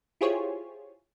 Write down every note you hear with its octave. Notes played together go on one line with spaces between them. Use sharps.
E4 F4 G4 G#4 C5 C#5